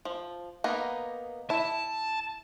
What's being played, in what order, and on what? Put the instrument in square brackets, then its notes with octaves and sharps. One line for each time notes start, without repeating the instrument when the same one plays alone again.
[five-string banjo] F3
A#3 B3 D#4
[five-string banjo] E4 [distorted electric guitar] A5